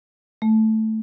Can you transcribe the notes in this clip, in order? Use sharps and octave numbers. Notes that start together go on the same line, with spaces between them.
A3